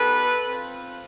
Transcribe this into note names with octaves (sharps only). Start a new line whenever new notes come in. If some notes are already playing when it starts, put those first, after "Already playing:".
Already playing: B3 D#4 G4 A4 B4
C4 F4